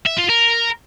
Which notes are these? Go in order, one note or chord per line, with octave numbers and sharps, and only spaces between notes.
E5
F4
A#4